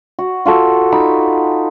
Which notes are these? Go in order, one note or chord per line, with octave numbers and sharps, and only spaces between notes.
F#4
F4 F#4 A4
D#4 B5 D6